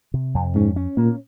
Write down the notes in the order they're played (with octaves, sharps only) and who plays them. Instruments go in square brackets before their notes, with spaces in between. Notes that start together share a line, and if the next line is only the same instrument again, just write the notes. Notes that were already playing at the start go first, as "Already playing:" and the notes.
[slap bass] C3
F2
[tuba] G#2 [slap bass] C#4
[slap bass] C#4
[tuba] A#2 [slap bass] A#3